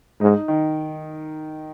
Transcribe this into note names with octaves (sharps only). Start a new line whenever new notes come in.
G#2 D#4
D#3